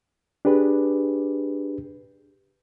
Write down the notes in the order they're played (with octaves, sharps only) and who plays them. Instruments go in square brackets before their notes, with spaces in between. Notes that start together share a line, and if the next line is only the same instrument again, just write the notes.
[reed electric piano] D4 G4 G#4 B4